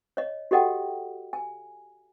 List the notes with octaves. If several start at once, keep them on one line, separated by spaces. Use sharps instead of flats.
C#5 D#5
F#4 G4 A4 D#5 F#5 G5
G#5